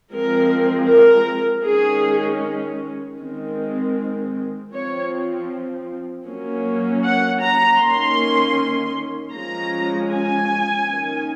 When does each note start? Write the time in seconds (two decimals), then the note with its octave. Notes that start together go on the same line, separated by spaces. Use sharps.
0.12 F3 G#3 C4 A#4
0.88 A#4
1.65 D#3 G#3 C#4 G#4
3.18 D#3 G#3 C4
4.72 F3 C4 C#5
6.26 F#3 A#3 C#4
7.03 F#5
7.41 A#5
7.80 D#3 A#3 C#4 C6
9.33 F3 G#3 C#4 A#5
10.10 G#5
10.86 D#3 A#3 C#4